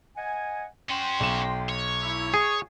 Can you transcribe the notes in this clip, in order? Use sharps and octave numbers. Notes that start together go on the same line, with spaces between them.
D#5 F#5 G#5
C#4 F#4 G5 C6
B1 E7
C#5
E4
G#4 C#6 D#6